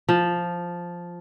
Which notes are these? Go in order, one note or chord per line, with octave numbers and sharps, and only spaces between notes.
F3